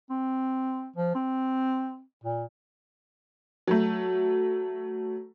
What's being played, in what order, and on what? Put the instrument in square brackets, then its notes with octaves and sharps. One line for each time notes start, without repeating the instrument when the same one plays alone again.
[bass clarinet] C4
F3
C4
A#2
[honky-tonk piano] F#3 A3